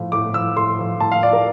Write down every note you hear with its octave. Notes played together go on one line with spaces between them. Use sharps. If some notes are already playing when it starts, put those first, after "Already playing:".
Already playing: A2 F3
A2 D6
F3 E6
A2 C6
F3
A2 A5
F5
F3 D5
A#4